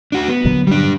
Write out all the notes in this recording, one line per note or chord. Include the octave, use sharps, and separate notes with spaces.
D4 F#4
B3
A#2 D3 F#3
G3 D4